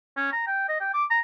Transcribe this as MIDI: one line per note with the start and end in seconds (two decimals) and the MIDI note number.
0.17 0.32 61
0.32 0.45 82
0.47 0.64 79
0.69 0.77 75
0.80 0.89 79
0.94 1.04 86
1.10 1.19 82